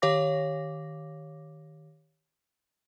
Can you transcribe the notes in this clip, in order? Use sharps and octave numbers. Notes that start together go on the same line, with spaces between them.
D#3 G4 C#5 F5 D6 A#6